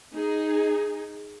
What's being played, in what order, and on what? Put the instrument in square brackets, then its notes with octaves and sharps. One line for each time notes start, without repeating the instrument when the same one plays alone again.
[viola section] D#4 G#4